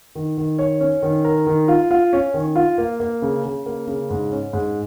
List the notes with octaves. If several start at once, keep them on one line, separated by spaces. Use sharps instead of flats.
D#3
D#3
C#5
C#4
D#3
A#4
D#3
F4
F4
C#4
D#3
F4
A#3
A#3
C#3
C#3
A#3
C#3
G#2
C#4
G#2